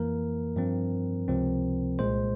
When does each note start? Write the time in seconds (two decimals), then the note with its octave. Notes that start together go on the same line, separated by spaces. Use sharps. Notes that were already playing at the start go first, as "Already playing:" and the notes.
Already playing: F2 E3 A#3 A#4
0.56 G2 F3 C4
1.28 C#2 C3 F3 C4
1.99 C2 A#2 G#3 C5